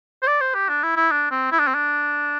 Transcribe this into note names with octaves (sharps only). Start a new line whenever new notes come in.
C5
D5
C5
G4
D4
E4
E4
D4
C4
E4
D4
C4
D4